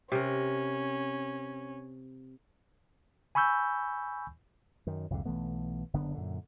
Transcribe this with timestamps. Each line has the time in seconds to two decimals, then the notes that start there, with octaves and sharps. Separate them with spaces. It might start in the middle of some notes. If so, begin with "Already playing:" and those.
0.12 C3 C#4 A#4
3.35 G#5 B5 C#6 E6 G6
4.87 F#2 D#3
5.10 C2 F2 G#2 D3
5.25 B1 E3 A3 B3
5.93 F#1 D3 B3
6.14 F#2 A#2 D3